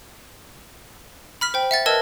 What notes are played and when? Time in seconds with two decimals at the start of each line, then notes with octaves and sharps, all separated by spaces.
1.41 B5 F6 B6
1.54 C5 G5
1.71 E5 F#5 A6
1.86 A#4 B4 D#5 A5 E6 G#6